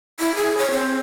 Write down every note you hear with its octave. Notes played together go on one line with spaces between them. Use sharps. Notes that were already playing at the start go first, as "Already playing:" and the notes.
E4
G#4
C#5
C4